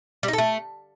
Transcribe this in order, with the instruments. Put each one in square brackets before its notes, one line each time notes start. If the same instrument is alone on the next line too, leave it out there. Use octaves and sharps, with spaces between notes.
[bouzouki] G3
D#4
A4
A3